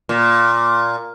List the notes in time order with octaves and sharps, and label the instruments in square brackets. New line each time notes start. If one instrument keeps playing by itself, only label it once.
[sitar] A#2